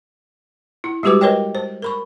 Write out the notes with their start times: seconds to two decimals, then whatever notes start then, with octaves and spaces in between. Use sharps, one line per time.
0.84 E4
1.03 G3 G#3 F#4 G4 B4 D6
1.21 A#4 B4 C#5 D#5 G5
1.55 C5
1.82 A#4 B5 C#6